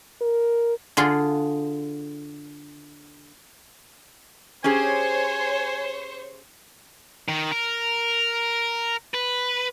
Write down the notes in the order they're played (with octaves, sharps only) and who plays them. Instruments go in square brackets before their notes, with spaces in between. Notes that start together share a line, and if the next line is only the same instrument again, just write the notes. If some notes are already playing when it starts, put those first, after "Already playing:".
[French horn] A#4
[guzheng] D3 F4 G#4 C6
[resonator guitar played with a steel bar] C#4 G4 G#4 [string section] C5 C#5 [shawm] G#5
[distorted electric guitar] D#3
A#4
B4